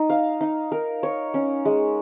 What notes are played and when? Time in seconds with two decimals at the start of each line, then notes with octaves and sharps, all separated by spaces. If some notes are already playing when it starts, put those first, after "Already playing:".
Already playing: D#4
0.10 F5
0.41 D#4
0.72 A#4
1.03 C#5
1.34 C#4
1.65 G#3